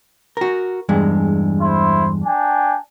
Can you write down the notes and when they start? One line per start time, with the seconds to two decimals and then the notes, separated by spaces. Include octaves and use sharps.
0.37 F#4 A#4
0.89 E2 G2 G#3
1.61 E4 C5 C6
2.25 D4 G5 G#5